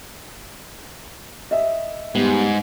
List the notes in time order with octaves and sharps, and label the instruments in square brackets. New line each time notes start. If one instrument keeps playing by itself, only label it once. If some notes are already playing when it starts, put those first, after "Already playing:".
[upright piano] D#5 E5
[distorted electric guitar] G#2 [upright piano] G3 B3